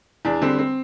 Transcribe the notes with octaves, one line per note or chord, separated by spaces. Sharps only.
E2 D4
D3 G3 C4
C4